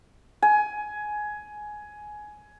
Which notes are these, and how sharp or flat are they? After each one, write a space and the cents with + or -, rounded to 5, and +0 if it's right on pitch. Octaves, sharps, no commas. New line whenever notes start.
G#5 +15